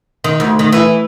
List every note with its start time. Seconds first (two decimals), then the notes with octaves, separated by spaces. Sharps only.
0.24 D#3
0.40 D2
0.59 D#3
0.72 E3